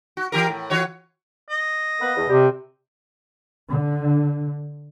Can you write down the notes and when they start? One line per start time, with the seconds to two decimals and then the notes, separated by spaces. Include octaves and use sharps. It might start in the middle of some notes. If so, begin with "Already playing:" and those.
0.17 F#4
0.32 E3 G4 A#4
0.49 A2
0.70 E3 F#4 C#5
1.50 D#5
2.00 A#3 B3 B4
2.17 E2
2.29 C3 G3 G4
3.70 D3